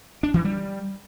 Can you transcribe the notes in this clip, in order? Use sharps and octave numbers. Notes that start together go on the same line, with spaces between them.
D4
E3
G3